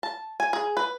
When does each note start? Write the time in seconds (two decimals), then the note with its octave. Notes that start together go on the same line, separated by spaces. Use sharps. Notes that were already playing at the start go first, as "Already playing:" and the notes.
0.03 A5
0.40 G#5
0.53 G#4
0.77 B4